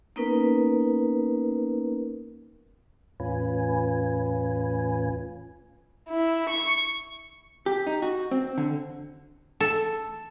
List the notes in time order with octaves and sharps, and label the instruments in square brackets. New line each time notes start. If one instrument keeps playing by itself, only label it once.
[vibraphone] A#3 B3 C#4 D#4 A#4 B4
[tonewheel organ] E2 A2 C#4 F4 B4 G#5
[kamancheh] E4
C#6
[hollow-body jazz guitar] G4
D#4
F#4
C4
D3
[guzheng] A4